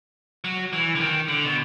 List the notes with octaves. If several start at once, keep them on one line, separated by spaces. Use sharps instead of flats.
F#3
E3
D3
D#3
D3
B2